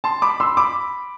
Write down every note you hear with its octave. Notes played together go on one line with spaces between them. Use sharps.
A5 C6
B5 D6
C6 E6
B5 D6